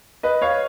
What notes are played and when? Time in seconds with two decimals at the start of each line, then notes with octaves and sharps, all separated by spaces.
0.23 B4 D#5
0.42 C#5 F5